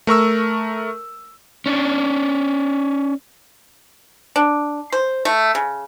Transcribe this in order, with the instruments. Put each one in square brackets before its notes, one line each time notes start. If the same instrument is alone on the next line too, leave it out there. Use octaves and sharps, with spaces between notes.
[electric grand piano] A3 A#4 C#6 E6
[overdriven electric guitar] C#4 D4
[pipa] D4
C5
A3
C#3